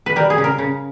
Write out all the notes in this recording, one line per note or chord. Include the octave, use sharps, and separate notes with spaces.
B4
G3 A#4
G#4
C#3
A#4
C#3